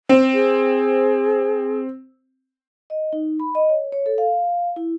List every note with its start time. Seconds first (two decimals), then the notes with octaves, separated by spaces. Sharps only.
0.09 C4
0.34 G#4
2.90 D#5
3.13 D#4
3.40 B5
3.55 D#5
3.69 C#5
3.92 C#5
4.06 A4
4.18 F5
4.76 E4